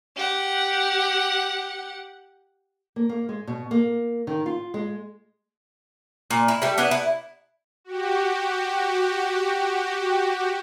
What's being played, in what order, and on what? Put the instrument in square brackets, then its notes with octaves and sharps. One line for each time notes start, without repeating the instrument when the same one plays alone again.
[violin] G4 F#5
[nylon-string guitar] A#3
A#3
G#3
B2
A#3
D#3
F4
G#3
[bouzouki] A#2
E4
G3 A3
B3 D4 E4
E4
[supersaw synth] F#4 G4